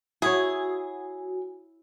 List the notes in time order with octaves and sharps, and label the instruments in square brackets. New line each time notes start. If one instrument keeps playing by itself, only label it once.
[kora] E4 C#5 [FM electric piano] F#4 [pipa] G#4